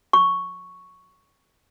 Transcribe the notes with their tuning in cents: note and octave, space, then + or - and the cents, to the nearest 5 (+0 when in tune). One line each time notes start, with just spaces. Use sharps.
C#6 +0